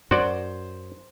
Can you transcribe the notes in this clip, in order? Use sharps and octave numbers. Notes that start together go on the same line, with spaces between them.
F#2 F#4 C5 D5 C6